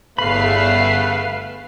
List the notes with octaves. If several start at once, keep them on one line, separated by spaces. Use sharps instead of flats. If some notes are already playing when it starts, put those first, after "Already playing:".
G1 E2 C#3 A3 B4 F5 B5 C7